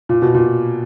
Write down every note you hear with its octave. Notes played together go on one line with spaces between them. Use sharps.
A#2
B2
A#2